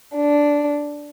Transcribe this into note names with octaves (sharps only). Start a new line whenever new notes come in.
D4